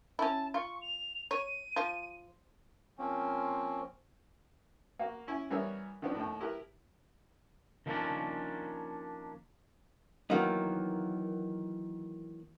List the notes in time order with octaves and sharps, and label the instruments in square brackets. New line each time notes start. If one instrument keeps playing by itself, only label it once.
[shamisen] C#4 E4 [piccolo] A5
[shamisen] F4 [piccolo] C#6
[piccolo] F7
[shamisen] C#5 [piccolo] D#7
[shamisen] F3
[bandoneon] F3 A#3 C4 C#4
[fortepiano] A#3 F#4
C#4 E4 G#5
E3 G3 B3 A#4 C#5 E5
D#3 F3 B3 C4 D4
D#2 A2
E4 G4 A#4 B4
[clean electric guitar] D#3 F3 G3 A#3 C#4 D4
[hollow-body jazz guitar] D#3 E3 F#3 A#3 B3 D#4